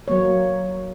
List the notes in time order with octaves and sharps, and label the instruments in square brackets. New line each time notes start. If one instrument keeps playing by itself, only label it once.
[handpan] F#3 A#3 C#5